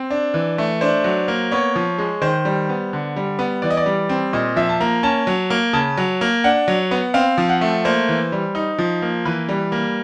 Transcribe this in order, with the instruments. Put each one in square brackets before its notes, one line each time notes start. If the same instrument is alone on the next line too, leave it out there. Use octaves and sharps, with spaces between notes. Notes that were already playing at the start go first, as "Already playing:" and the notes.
Already playing: [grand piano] C4
D4
E3
A3
D4 C5
F#3
A#3
B3 C#5
F3
G#3
D#3 C5
G3
B3
D3
G3
B3
E3 D5
D#5
D5
G3
C4
A#2 D#5
F3 E5
A5
A#3 A#5
C#4 A5
F#3
A#3
C#3 A5
F#3
A#3
D4 F#5
F#3
B3
C4 F5
F3
F#5
A3
A#3 C5
E3
G3
D#4
F3
A#3
E3 B4
G3
A#3